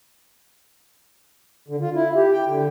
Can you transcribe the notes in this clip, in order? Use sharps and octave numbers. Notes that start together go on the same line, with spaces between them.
D3
F4
E4
G4
G5
D3